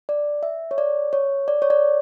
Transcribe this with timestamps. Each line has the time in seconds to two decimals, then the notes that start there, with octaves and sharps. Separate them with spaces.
0.09 D5
0.43 E5
0.71 C#5
0.78 D5
1.13 C#5
1.48 D5
1.62 C#5
1.70 D5